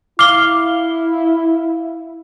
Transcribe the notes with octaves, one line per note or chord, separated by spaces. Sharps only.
E4 F5 D6 G7